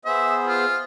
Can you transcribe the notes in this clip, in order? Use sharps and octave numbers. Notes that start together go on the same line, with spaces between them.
B3 G#4 C5 E5
F4